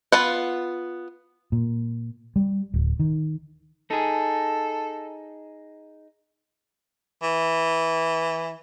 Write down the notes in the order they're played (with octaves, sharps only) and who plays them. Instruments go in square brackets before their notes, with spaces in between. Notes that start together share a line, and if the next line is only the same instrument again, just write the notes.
[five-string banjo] B3 F4 F#5
[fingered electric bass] A#2
G3
D1
D#3
[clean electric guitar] D#4 G#4 [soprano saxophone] A4
[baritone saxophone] E3